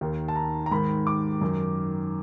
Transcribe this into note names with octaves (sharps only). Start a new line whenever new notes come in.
D#2 D#3
A5
A#5
A#5
G#2 D#3 B5
D6
F#2 D#3